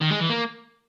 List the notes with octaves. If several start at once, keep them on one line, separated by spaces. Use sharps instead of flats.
D#3
G#3
E3
A#3